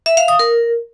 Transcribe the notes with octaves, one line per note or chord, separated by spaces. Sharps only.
E5
F5
D#6
A#4